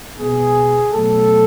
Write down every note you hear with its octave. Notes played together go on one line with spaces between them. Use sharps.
B2 G#3 B3 G#4
B2 F#3 A3 A4